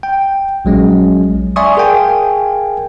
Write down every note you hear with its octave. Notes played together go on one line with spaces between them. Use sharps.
G5
A#1 F#3 G#3 C#4
D5 E5 G#5 C6 C#6 D#6
G#4 A#4 F5 G5 G#5